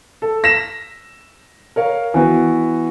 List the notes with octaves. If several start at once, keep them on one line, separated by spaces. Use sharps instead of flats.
A4
A#6 B6 E7
A#4 C#5 F5
E3 B3 F#4